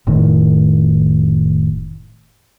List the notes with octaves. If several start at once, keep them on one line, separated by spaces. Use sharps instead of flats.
F1 A2 D#3